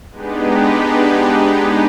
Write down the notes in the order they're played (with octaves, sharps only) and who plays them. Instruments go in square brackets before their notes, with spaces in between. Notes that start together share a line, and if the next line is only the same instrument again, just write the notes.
[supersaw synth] G#3 B3 D4 D#4 G4 B4